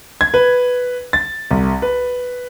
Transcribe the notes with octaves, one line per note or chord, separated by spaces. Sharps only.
G#6
B4
A6
C2
B4